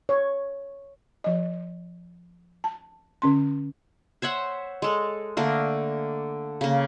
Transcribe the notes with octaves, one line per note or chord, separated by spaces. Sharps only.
C#5
F3 D#5
A5
D3 C#4 C6
C5 C#5 E5 F#5
G#3 A4
D3 A3 A#3
C#3 A#3